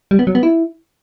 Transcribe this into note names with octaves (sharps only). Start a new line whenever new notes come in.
G3
B3
F#3
B3
E4